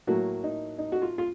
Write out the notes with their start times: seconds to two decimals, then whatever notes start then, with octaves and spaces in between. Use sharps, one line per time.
0.07 A2 F#3 A#3 F#4
0.44 D#4
0.78 D#4
0.92 F#4
1.02 F4
1.18 F4